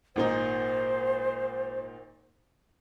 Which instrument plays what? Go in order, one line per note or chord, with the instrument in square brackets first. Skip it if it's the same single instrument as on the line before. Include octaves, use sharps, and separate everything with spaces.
[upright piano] G#1 A#2 D#4 [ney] C5